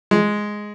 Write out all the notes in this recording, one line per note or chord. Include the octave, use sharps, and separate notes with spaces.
G#3